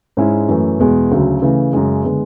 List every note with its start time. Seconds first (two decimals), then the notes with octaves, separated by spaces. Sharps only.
0.17 G#2 G#3 C#4 E4
0.48 F#2 E3 A3
0.79 E2 B2 G#3
1.11 D2 C#3 F#3
1.42 C#3 E3 A3
1.73 F#2 C#3 G#3
2.04 D3 G#3 B3